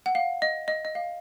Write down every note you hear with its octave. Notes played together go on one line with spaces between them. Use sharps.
F#5
F5
D#5
D#5
D#5
F5